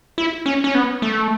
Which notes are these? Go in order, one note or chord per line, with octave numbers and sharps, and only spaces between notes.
E4
C#4
C#4
B3
A3